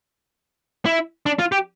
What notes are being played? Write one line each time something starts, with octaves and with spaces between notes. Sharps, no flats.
E4
D4
F4
G4